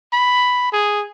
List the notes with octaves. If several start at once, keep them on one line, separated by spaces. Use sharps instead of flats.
B5
G#4